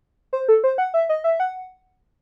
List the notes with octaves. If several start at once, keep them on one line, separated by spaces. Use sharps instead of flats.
C5
A4
C5
F#5
E5
D#5
E5
F#5